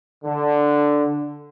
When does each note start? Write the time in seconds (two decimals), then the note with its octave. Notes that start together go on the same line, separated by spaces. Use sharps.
0.24 D3